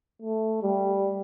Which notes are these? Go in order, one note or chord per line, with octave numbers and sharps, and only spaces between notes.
A3
G3